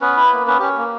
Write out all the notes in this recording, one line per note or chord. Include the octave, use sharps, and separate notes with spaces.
B3 C#4 B4
E4
A#3
B3 C#4 B4
C#4 G4
A#3